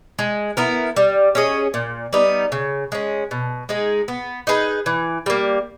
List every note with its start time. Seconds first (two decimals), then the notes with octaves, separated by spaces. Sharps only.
0.19 G#3
0.57 B3 E4 A#4
0.96 G3
1.35 C#4 G#4 D#5
1.74 A#2
2.13 G3 B3 D#4
2.52 C#3
2.92 G#3 C#4
3.31 B2
3.69 G#3 D#4 G#4
4.08 B3
4.47 D#4 G#4 B4
4.86 E3
5.26 G3 A#3